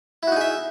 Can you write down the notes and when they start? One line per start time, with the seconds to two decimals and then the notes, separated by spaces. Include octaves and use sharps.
0.23 E4
0.27 F#4
0.32 D#4
0.36 G#4
0.41 E5